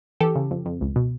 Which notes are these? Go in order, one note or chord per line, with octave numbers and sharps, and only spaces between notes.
E3 G4 A4
C#3
F2
F2
C#2
B2